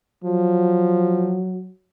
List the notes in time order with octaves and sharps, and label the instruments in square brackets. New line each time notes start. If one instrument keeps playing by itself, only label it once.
[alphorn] F3 [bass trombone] F#3